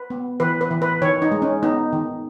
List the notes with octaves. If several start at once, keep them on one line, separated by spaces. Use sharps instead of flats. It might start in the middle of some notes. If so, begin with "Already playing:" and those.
Already playing: B4
B3
E3 B4
B4
E3
B4
D#3 C#5
D#4
G#3
C#4
B3 D#4
D#3